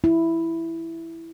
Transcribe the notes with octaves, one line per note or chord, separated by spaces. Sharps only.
E4